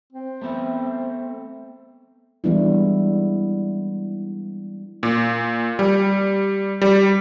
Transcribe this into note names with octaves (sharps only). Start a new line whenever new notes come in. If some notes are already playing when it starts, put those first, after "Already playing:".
C4
A3 B3 E5
E3 G3 G#3 B3 D4 E4
A#2
G3
G3